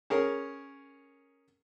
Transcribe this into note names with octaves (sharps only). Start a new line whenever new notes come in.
C#4 G#4 A#4